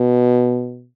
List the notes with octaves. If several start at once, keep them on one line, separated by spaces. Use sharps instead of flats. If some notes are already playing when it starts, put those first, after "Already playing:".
Already playing: B2